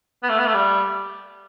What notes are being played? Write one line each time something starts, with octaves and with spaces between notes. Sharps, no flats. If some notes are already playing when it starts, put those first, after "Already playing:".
B3
A3
B3
A3
G3